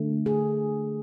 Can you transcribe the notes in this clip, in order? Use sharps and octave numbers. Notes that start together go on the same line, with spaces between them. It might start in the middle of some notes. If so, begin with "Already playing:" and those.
Already playing: D3 A3
G#4